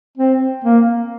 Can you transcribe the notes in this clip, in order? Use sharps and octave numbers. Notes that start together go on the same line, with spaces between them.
C4
A#3